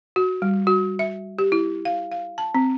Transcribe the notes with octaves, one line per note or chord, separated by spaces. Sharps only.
F#4
G3
F#4
E5
G4
E4
F5
F5
A5
C4